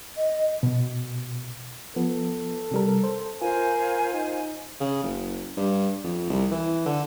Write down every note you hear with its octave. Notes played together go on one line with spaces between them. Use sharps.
D#5
B2
F3 B3 A4
C3 G3 A#4
C5
F4 A#4 C5 F5 G#5
D#4
C#3
F#1
G2
F2
C2
E3
D3